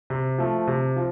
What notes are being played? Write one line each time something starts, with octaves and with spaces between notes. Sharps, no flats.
C3
F3 A3
C3
F3